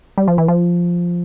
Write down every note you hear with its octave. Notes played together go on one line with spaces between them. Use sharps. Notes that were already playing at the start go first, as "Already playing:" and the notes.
G3
F3
E3
F3